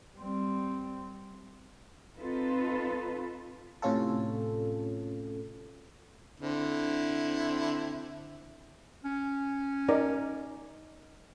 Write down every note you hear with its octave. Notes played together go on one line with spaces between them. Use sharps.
G3 C4
C4 D#4 F4 A4 B4
A2 C3 C#4 F4 A4
D3 C4 E4
C#4
D#4 A#4 D5